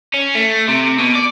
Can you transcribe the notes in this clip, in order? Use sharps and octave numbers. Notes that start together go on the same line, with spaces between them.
C#4
A3
C3
B2
D5